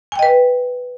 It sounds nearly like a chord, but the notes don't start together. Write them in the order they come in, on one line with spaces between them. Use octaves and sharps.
G#5 G5 D#5 B4